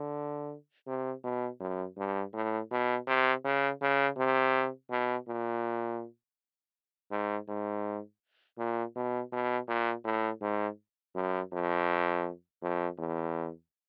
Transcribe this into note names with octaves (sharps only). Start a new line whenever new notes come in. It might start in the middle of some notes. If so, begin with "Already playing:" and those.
Already playing: D3
C3
B2
F#2
G2
A2
B2
C3
C#3
C#3
C3
B2
A#2
G#2
G#2
A#2
B2
B2
A#2
A2
G#2
F#2
F2
F2
E2